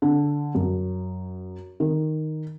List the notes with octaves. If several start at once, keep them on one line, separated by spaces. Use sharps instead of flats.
D3
F#2
D#3